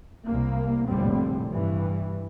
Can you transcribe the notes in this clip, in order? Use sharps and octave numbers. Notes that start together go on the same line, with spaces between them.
C2 A#3
F1 A#1 A2 D3 G3 C4
G2 E3